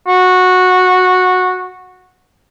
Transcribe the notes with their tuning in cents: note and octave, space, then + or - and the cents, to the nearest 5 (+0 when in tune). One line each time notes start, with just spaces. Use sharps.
F#4 -10